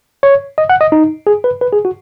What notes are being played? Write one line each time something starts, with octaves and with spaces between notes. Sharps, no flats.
C#5
D#5
F#5
D#5
D#4
G#4
B4
B4
G#4
F#4